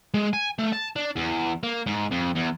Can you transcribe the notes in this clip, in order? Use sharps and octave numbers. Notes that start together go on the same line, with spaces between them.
G#3
G#5
A3
A5
D4
E2
A#3
G#2
F2
E2